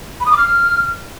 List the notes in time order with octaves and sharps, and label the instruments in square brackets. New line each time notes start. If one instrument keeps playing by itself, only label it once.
[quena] B5
D#6
D6
F6